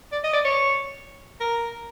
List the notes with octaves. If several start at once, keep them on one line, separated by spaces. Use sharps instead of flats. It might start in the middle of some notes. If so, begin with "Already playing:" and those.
D5
D#5
D5
C#5
A#4